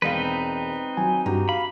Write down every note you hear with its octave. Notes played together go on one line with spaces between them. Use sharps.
E1 C4 D#4 B4 F5
F#3 G#5
G2 F#4 G4 A#5
F5 B5